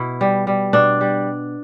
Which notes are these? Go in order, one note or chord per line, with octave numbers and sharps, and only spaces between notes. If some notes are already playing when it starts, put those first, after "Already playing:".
Already playing: B2 E4
G3
G3
B2 D4
G3